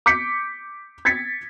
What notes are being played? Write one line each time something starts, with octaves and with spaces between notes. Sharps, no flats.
D6 G6 B6 C#7
G#6 A6 B6 C#7